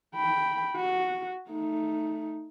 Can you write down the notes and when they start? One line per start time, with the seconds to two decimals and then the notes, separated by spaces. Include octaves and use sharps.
0.15 G5 B5
0.76 F#4
1.50 A3 D#4